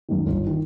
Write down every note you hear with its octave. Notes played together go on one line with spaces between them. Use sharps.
F#2 D#3
G1
D#3